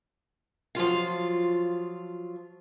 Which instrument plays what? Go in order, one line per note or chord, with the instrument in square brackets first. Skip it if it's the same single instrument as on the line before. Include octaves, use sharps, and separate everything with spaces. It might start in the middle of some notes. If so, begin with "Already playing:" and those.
[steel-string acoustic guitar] F3 F#3 F4 F5